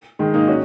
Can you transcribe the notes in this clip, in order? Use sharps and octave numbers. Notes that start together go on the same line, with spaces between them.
D#3 G#3
A#3 D#4
C#4 F#4